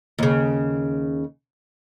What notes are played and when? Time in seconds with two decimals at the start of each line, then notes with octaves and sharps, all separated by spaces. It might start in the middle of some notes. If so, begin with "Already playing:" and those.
0.18 D#2 C#3